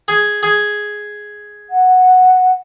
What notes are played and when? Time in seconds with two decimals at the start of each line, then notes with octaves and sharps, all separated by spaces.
0.08 G#4
0.43 G#4
1.70 F#5